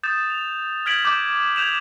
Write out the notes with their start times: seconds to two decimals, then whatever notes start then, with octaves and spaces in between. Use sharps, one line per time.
0.03 D#6 G6 A6 E7
0.30 F7
0.86 F6 G6 G#6 B6 D7 F#7
1.05 D6 G6
1.56 G6 G#6 E7 F7